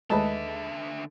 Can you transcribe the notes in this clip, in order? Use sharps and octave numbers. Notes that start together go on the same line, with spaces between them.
D#2 D3 G#3 A3 B4 D#5 E5 A5